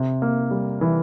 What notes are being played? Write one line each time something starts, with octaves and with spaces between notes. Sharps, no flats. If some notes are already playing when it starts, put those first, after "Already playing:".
Already playing: C3
A#3
G3
E3